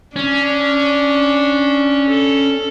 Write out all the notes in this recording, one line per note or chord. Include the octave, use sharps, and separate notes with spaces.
C#4 D4
A4